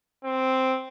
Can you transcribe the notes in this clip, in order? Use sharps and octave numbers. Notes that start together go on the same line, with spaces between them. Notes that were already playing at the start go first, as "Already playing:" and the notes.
C4